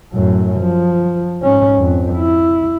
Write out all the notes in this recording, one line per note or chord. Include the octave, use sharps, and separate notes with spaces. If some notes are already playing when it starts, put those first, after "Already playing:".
F#2 A2
F3
G#2 C#4
F2
E4